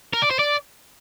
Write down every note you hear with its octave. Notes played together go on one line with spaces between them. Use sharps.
A#4
D5
C5
D5